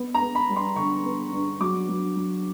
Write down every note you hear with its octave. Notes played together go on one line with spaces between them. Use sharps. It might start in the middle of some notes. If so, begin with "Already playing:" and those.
Already playing: B3
A#5
B3
B5
G3
C6
D3 C#6
B3
G2
F#3 D6
F#3
F#3